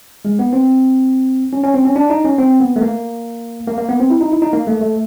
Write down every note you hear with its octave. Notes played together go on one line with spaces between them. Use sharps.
G#3
B3
C4
C#4
C#4
C4
C#4
D4
D#4
C#4
C4
B3
A3
A#3
A#3
A#3
B3
C4
E4
D#4
E4
D#4
A#3
A3
A3